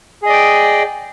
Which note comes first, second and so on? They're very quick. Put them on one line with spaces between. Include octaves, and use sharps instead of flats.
G#4 D#5 D5 G5